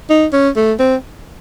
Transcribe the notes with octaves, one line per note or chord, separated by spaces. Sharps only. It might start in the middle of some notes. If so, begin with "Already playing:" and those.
D#4
C#4
A3
C4